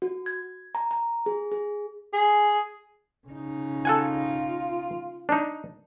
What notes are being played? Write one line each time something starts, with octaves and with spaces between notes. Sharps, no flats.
F#4
G#6
A#5
A#5
G#4
G#4
G#4
C#3 D#4
F4 A4 F#5 G#5
D4 D#4